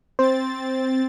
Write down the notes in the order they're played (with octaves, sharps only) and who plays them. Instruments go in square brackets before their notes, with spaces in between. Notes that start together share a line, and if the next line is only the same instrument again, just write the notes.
[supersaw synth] C4 A6 [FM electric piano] C5